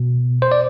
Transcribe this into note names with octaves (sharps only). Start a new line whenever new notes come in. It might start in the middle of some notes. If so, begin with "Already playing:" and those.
Already playing: B2
C5
D5